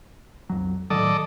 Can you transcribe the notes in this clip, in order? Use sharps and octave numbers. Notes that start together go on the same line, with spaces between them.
B1 F2 F#3
A2 D#3 F#3 A4 D5 D#5